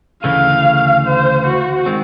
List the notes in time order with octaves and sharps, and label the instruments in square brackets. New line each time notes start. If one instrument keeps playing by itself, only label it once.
[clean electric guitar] D2 C#3 E3 A3 [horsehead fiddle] F5
[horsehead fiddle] C5
F#4
[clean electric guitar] D#3 G#3 C4